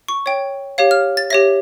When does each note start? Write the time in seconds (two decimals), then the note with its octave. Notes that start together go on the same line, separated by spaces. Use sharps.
0.08 C#6
0.26 C#5 G5
0.78 G4 C#5 F5
0.91 F6
1.17 A6
1.30 G4 C#5 E5 A#6